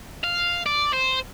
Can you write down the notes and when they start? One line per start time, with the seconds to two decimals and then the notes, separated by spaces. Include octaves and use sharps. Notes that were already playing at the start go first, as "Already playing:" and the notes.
0.24 F5
0.66 D5
0.94 C5